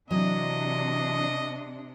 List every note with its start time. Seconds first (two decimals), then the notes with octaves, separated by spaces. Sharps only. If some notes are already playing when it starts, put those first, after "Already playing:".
0.11 C3 E3 F#3 D4 D#5